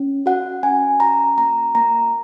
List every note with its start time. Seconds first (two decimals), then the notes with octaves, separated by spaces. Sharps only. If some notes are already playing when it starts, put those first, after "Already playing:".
Already playing: C#4
0.26 F#4 F#5
0.63 C#4 G#5
1.00 F#4 A#5
1.38 A#3 A#5
1.75 A#3 A#5